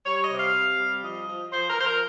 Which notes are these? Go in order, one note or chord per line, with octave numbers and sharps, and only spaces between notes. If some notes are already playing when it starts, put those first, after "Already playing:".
G3 C#5
D#5
C3
F5
C3
G3
F3 D#5
F3
F3 C5
A#4
F3 C5
A#4